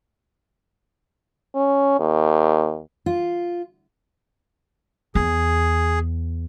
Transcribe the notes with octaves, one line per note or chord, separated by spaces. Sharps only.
C#4
D#2
F4
E2 G#4